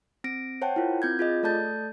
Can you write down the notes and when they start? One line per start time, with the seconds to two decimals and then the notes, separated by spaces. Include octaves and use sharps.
0.24 C4 A#6 D7
0.61 C5 C#5 F#5 G5 A5
0.76 E4 F4 A#4
1.02 C4 G6 G#6
1.19 F4 G#4 D#5
1.43 A3 A4 D5 A5 G6 A6